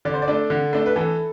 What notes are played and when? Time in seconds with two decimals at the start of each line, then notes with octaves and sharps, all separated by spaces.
0.05 D3 D5
0.14 C5
0.22 D5
0.28 A3 D4
0.50 D3
0.73 A3 D4
0.86 B4
0.96 E3 A4